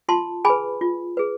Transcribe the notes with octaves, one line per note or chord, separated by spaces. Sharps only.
F4 A5 C6
G#4 B4 G#5 B5
F4
G#4 B4